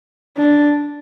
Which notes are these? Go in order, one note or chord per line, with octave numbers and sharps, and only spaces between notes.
D4